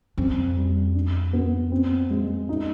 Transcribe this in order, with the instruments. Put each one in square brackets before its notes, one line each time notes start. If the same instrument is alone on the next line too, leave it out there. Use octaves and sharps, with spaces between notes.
[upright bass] F2 [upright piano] C4
[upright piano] G3
D4
B3
C4
G#3
D#4